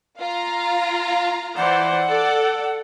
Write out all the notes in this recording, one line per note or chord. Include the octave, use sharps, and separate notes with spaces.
F4 F5 A#5
E3 C5 D5 F#5
A4 D5